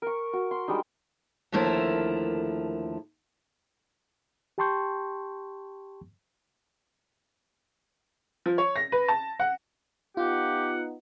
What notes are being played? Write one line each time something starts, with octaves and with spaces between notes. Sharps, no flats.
A#4 C#6
F#4
C6
G3 G#3 D4 D#4
D#2 D3 F3 A3 E4 A#4
G4 G5 A5 C6 C#6 G6
F3
C#5
A#6
B4
A5
F#5
B3 D#4 F4 G4 F#5